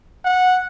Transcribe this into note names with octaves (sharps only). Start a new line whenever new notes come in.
F#5